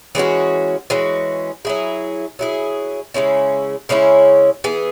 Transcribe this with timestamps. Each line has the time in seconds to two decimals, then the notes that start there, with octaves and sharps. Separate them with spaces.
0.15 E3 G#3 C#4 F#4
0.90 E3 G#3 C#4 F#4
1.65 F#3 E4 G#4
2.39 F#3 E4 G#4
3.14 C#3 G#3 C#4 E4
3.89 C#3 G#3 C#4 E4
4.64 E3 B3 G#4